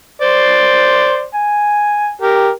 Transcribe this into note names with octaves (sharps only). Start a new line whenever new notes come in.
C5 D5 C6
G#5
G4 A#4